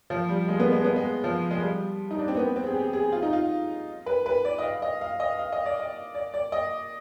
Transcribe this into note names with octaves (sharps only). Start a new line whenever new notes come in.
F3
G3
G#3
B3
G#3
B3
G#3
F3
G#3
G3
D#4
D4
C4
B3
C4
G#4
G4
G#4
F4
D#4
F4
B4
B4
D5
D#5
F5
D#5
F5
D#5
F5
D#5
D5
D#5
D5
D5
D#5